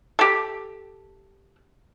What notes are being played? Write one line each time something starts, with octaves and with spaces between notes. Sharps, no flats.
G4 A4